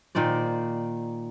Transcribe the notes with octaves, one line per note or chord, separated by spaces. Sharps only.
A#2 D#3 C5 D5